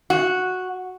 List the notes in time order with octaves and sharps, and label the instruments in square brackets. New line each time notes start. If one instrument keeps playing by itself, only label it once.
[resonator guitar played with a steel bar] F#4